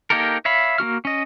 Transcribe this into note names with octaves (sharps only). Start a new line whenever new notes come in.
A#3 D#4 G4 A4 A#4
C#5 E5 F5 B5
A#3 D4 F#4 F6
C#4 D#5